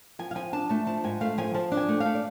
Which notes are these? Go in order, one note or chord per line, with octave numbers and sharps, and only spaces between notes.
F3 G#5
F5
F3 G#5
D4 A5
A3 A5
F3 A5
G#2 G#5
A3 F5
F3 G#5
F3 A5
D4
G#5
A3
A3 F5
D5